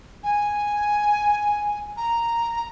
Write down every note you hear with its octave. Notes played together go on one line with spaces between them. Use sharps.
G#5
A#5